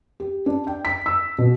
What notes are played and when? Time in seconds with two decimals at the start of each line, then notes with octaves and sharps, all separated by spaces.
0.20 G4
0.46 D4
0.67 G5
0.85 B6
1.06 E6
1.38 B2